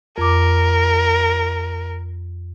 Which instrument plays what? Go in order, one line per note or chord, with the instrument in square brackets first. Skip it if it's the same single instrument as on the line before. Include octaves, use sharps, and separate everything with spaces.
[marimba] F2 D6 [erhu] A#4